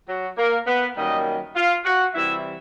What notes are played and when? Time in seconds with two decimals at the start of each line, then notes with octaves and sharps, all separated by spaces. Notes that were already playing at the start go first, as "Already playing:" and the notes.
0.08 F#3 F#4
0.38 A#3 A#4
0.67 B3 B4
0.96 F#2 D#3 G3 A#3 D#4 D#5
1.55 F4 F5
1.85 F#4 F#5
2.14 C3 E3 G3 E4 E5